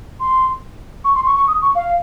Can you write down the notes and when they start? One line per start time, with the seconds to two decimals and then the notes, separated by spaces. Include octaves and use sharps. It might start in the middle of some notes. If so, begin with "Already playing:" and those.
0.20 C6
1.04 C#6
1.15 C6
1.26 C#6
1.36 C#6
1.48 D#6
1.62 C#6
1.75 F5